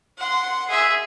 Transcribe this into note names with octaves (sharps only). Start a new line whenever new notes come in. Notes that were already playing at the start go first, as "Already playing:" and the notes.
F#5 C6
G#4 E5